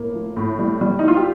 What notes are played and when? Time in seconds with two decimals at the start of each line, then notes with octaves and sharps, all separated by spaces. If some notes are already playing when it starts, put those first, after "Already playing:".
Already playing: A2 A#3
0.14 F3
0.37 A2
0.59 G3
0.81 G3
0.99 D#4
1.03 G3 F4
1.17 G4